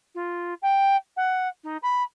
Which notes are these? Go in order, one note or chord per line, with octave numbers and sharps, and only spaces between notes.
F4
G5
F#5
D#4
B5